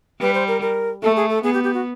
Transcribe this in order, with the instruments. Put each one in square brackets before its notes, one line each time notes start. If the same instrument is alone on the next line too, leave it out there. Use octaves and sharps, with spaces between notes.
[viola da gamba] G3 [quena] B4
[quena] C5
A#4
A#4
[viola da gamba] A3 [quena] A4
[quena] G#4
A4
[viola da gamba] B3 [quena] G#4
[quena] G4
G4
F#4